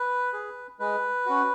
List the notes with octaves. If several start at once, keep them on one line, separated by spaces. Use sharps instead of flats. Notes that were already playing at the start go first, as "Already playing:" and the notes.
Already playing: B4
G#4
G#3 B4
C#4 F#4